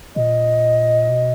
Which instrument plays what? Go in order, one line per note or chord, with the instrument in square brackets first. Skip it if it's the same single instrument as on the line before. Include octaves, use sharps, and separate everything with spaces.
[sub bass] A#2 [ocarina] D#5
[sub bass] B2